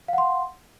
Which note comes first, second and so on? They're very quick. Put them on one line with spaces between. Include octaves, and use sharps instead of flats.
F5 F#5 C6